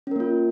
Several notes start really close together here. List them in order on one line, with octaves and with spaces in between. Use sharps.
C#4 A#4 A#3 F4